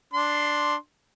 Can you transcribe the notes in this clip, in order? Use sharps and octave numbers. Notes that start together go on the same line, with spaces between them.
D4 C6